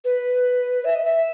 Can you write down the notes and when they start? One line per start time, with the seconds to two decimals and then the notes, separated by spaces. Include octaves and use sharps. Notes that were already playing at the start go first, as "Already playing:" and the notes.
0.04 B4
0.84 E5
0.94 D#5
1.04 E5